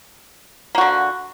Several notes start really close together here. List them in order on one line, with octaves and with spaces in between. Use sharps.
A#3 F#4 D3